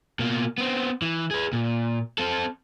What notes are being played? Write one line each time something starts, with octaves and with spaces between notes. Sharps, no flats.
B2 A#3
B3 C4
E3
G#4 B4
A#2
C4 A4